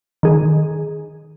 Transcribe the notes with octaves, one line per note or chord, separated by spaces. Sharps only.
D#3 G#4